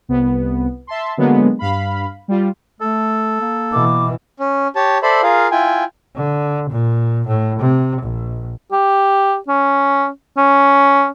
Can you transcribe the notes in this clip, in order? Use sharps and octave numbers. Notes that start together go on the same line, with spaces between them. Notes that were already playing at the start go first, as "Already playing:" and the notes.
C2 B3
E5 A5 C6
D3 F#3 G#3 A#3 B3
G2 F5 B5
G3 F4
A3 A4
A#3
B2 E3 D6
C#4
G4 C#5 A5
A4 C5 D5 E5 B5
F4 G#4 A#4 F5
E4 F4 G5 G#5
D3
A#2
A2
C3
A#1
G4
C#4
C#4